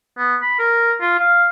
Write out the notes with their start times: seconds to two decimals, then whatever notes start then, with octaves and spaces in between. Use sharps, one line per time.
0.18 B3
0.42 B5
0.59 A#4
1.01 F4
1.19 F5